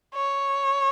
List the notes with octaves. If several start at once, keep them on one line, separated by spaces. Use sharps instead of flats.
C#5